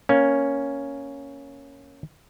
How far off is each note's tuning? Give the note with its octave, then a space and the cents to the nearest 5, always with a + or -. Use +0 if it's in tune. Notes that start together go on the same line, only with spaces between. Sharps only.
A#3 +0 C#4 +0